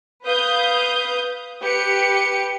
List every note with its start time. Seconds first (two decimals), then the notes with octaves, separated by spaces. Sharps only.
0.24 B4 F5 D#6 G6
1.62 G4 B4 C#7